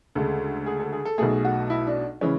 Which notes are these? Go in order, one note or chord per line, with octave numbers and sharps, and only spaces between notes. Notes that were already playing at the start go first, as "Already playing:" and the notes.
D2 C#3 G#3 A4
G#4
A4
G#4
A4
B1 B2 A3 G#4
F#4
E4
D4
C#3 E3 G#3 C#4